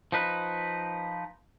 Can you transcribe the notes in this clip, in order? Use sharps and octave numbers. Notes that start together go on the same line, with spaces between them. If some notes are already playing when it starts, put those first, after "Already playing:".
F3 D#4 B4